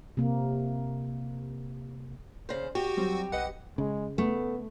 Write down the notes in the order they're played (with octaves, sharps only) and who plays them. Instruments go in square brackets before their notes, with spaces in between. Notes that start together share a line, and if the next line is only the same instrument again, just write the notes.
[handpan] C3 A#3
[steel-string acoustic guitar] C#3 C5
[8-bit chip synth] F#4 [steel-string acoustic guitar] G4
[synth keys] F#3 G3 C4
[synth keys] B1 B4 D#5 [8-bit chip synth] F#5
[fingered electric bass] C#3 [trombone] G#3
[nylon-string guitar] A3 [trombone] B3